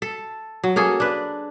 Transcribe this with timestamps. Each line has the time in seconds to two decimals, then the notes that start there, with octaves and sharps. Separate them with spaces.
0.02 A4
0.64 F#3
0.76 A#3 C#4 G#4 A4
1.00 D4 B4